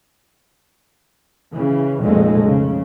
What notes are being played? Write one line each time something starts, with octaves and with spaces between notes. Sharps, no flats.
C#3 E3
F1 B1 F2 A#2 G#3 A3
C#3